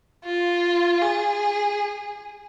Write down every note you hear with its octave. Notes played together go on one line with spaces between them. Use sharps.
F4
G#4